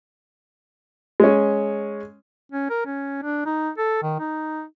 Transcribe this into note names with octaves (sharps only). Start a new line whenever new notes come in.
G#3 C#4
C#4
A#4
C#4
D4
D#4
A4
D#3
D#4